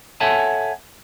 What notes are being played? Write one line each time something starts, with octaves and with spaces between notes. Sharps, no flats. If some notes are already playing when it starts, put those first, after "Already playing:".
A4 C#5 E5 F#5 G#5 A5